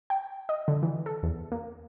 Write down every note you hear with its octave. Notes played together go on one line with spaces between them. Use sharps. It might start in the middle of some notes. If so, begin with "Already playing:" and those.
G5
D#5
D3
E3
A4
E2
A#3